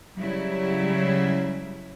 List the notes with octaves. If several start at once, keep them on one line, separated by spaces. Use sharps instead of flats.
C#3 F#3 G3 E4